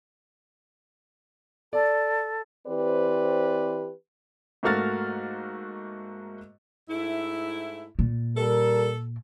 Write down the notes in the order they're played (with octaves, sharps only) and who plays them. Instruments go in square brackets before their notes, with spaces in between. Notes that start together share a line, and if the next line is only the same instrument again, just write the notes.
[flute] A4 [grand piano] D5
[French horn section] E3 C4 G4 B4 C5 D5
[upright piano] G#2 A3 A#3 F#4 F6 A6
[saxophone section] G#2 A3 E4
[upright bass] A#2
[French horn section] G3 A#4 [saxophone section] A4